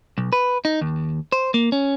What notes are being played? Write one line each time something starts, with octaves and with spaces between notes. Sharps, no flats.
B1
B4
D#4
D#2
C5
A#3
C#4